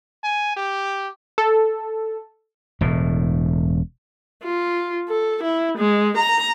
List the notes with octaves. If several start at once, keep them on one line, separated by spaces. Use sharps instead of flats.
G#5
G4
A4
E1 A2
F4
A4
E4
G#3
A#5